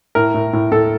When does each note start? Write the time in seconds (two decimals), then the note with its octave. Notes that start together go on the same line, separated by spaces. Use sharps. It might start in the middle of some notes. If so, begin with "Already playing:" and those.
0.15 A2 A#4
0.34 A2
0.53 A2
0.72 A2 A4